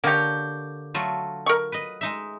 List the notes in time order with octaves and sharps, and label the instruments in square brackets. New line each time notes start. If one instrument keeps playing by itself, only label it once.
[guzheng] D3 A#4 C#5 [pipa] A#3 G4
[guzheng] F#3 A3 F4
[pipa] A#4 C#6
[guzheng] B4 D#5
G#3 D#4 E5